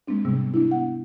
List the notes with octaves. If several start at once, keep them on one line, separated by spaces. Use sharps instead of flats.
G#3 A#3 C4 D4
G#2 C3 G3 B3
B3 D4 E4
F#5